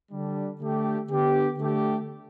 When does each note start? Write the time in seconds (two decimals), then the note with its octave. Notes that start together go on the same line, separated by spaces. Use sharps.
0.12 D3 G3 D4
0.60 D3 A3 G4
1.09 D3 B3 D4 G4
1.58 D3 A3 G4